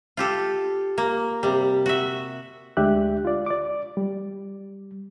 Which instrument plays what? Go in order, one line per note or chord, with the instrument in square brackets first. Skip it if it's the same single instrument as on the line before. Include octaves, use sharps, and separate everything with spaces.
[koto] F4 G4 A4
A#3
C3 G3
F#4 E5
[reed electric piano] D2 G#3 D4 G4 E5 F#6
F4 D5
D5 D6
G3